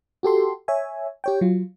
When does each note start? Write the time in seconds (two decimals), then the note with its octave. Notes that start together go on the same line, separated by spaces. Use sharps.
0.23 F#4 G4 A4 C6
0.68 C#5 E5 G#5
1.24 G4 C#5 G5
1.41 F#3 F4